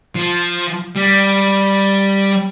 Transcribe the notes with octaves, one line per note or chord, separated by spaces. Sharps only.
F3
G3